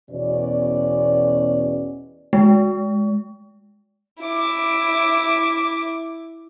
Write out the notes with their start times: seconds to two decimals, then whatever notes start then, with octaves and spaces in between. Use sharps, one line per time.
0.10 E2 B2 C#4 D5
2.33 G#3
4.22 E4 D6